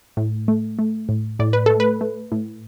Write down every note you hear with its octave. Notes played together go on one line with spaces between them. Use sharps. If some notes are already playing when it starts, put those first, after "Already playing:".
A2
A3
A3
A2
A2 D5
B4
A3 A4
B4
A3
A2